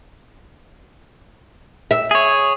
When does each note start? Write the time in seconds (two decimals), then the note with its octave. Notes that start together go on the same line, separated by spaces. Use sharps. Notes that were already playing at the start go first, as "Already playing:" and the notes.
1.91 E5
2.11 G#4 C#5